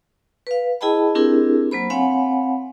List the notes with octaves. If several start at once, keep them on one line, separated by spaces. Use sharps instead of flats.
B4 F5
E4 G#4 D#5 G5 A5 B5
C4 D4 E4 G4 G#4 A#4
F#3 A#3 C5 B5
C4 C#5 F5 F#5 G#5 B5